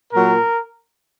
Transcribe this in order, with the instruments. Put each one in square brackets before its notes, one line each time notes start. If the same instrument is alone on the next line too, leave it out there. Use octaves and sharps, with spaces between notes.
[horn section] A#2 F#3 A#4